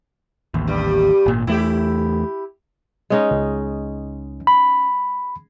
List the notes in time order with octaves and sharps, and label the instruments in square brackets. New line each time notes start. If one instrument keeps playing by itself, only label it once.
[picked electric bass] A1 D#2
[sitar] G2 G3
[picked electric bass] G#1 A#2
[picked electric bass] E2 A3 [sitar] E4 G4
[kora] G#3 C#4 D#4
[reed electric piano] C#2
B5